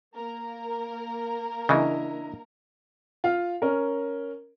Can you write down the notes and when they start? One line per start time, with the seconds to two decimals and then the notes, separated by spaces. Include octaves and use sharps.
0.16 A#3 A#4
1.69 C#3 E3 D4 E4 D#5
3.24 F4 F5
3.62 C#4 A#4